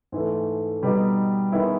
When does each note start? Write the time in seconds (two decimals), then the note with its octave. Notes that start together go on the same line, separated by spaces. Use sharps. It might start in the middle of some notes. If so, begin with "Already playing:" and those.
0.12 G#2 E3 A3
0.82 B2 G3 B3 D#4 G4
1.52 D#3 G#3 B3 E4